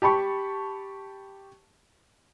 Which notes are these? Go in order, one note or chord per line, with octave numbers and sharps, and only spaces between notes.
G4 A5 B5 C#6